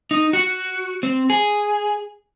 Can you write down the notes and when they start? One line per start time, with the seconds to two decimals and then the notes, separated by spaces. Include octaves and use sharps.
0.11 D#4
0.33 F#4
1.03 C4
1.30 G#4